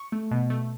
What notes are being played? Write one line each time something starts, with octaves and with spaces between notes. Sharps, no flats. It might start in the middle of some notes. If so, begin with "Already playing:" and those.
Already playing: C#6
A3
B2
A3